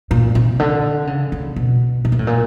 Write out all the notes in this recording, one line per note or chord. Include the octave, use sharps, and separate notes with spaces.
A#2
C3
D3
C#3
C#3
B2
B2
A#2
A2
A#2